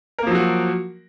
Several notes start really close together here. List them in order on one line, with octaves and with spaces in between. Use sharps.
A#4 A#3 F3 F#3 F#4